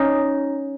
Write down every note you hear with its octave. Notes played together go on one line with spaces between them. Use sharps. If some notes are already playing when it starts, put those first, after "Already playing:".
Already playing: C#4 D#4